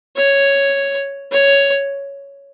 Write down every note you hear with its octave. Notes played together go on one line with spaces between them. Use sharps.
C#5
C#5